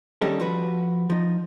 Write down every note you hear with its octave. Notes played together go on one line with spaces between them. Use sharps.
D#3 G3 C#4 D#4 G4 A4
F3 F#4 B4
F3 D#4